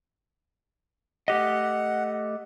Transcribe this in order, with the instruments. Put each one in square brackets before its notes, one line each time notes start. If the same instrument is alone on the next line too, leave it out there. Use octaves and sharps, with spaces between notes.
[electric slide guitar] A3 G4 D#5 [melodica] F#5